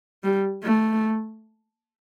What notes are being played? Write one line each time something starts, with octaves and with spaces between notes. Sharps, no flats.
G3
A3